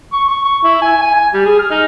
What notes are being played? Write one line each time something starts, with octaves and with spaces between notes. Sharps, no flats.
C#6
C#6
C#6
E4
G#5
G#5
G#5
G3
G#4
F6
D#4